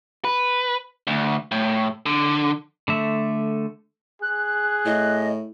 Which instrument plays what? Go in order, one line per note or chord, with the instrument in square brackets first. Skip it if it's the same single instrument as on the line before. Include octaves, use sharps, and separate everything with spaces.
[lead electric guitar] B4
D2
A2
D3
[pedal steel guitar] D3 A3 E5
[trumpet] G#4 [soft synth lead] F#6
[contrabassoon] A2 [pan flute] D#5